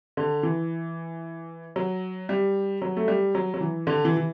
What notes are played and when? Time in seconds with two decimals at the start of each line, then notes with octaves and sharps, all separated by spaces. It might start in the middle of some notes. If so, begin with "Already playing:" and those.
0.17 D3
0.43 E3
1.76 F#3
2.29 G3
2.82 F#3
2.97 A3
3.08 G3
3.35 F#3
3.54 F#3
3.61 E3
3.87 D3
4.05 E3
4.17 E3